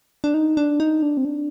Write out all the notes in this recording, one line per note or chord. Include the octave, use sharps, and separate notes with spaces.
D4
D#4
D4
D#4
D4
C4
D4